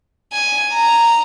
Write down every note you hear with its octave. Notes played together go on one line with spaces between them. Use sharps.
G#5
A#5